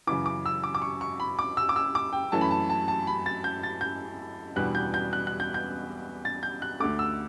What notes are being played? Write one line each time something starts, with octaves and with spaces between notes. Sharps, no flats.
F#2 C#3 E3 D6
D6
E6
D6
D6
C#6
C#6
B5
D6
E6
D6
E6
D6
G5
F#2 E3 A3 C#4 A5
B5
A5
A5
A5
B5
A6
G6
A6
G6
E2 B2 G3 D4 F#6
G6
G6
F#6
F#6
G6
G6
A6
G6
F#6
D2 D3 A3 D6
E6